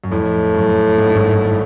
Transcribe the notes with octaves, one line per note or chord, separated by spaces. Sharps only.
F#2
F2 A2
F#2
G#2
G2
G#1 G#2